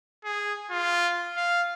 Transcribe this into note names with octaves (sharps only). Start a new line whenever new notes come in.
G#4
F4
F5